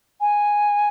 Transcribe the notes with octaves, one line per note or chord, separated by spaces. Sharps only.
G#5